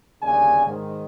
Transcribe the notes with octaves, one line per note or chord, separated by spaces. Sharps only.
G1 D#2 C#3 D5 G#5
G#2 D#3